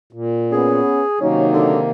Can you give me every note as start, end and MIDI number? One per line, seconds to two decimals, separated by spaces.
0.13 0.81 46
0.52 1.04 59
0.52 1.04 61
0.52 1.21 68
1.21 1.91 48
1.21 1.91 51
1.21 1.81 54
1.21 1.91 58
1.21 1.46 61
1.21 1.81 63
1.53 1.80 50